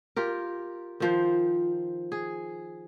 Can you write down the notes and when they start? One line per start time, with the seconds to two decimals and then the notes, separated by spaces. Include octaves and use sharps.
0.16 F4 G4 A#4
1.00 D#3 F3 C5
2.12 G#4